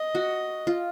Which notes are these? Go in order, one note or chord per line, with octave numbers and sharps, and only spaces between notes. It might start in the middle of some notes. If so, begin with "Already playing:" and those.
Already playing: D#5
F#4
F4